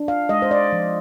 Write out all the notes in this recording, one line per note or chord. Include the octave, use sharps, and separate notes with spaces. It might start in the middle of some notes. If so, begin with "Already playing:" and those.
Already playing: D4
F5
G#3 D#5
C5
D5
F3